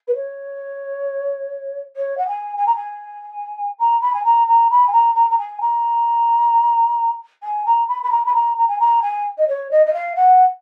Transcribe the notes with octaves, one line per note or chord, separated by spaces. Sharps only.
B4
C#5
C#5
F#5
G#5
G#5
A#5
G#5
A#5
B5
G#5
A#5
A#5
B5
G#5
A#5
A#5
A#5
G#5
A#5
G#5
A#5
B5
B5
A#5
B5
A#5
A#5
G#5
A#5
G#5
D#5
C#5
D#5
D#5
F5
F#5